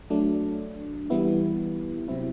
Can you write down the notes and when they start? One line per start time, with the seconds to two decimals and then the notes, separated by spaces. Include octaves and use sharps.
0.10 F#3 A3 D4
1.10 E3 G3 B3 E4
2.08 C3 F#3 C4 E4